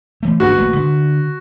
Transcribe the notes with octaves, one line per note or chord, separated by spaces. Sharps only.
E3 A3
G1 A#3 D4 F#4 B4
A1 G#3 A#3
D3